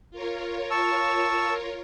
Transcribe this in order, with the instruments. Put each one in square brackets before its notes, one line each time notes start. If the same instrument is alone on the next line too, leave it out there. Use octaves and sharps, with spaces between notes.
[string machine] F4 A#4 C#5
[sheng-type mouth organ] A5 C#6 E6